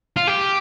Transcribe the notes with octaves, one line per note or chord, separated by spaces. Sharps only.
F4
G4